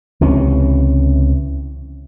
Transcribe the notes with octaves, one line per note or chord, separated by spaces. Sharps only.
C#2 C3 E3 C#4